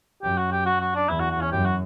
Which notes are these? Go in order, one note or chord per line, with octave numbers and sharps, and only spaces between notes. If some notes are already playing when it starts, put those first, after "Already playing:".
F#2 G4
F#4
G4
F#4
F#4
D4
E2 E4
F#4
F#4
C#4
F#2 G4
F#4